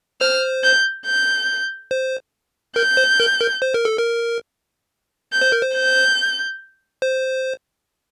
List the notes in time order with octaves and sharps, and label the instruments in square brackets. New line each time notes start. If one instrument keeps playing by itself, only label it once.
[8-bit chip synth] C5 [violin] F6
[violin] G6
G6
[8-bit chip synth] C5
[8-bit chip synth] A#4 [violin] G6
[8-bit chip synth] C5
A#4
A#4
C5
A#4
A4
A#4
[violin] G6
[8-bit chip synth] C5
A#4
C5
[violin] G6
[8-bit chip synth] C5